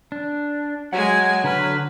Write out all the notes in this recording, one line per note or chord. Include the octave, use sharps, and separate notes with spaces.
D4
F#3 G#3 F#5 G#5
D3 B4 A#5 F6